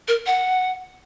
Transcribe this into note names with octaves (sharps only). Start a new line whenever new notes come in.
A#4
F#5